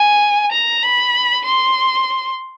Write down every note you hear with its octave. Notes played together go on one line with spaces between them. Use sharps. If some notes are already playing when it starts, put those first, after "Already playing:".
Already playing: G#5
A#5
B5
C6